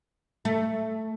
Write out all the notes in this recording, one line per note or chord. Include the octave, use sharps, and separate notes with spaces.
A3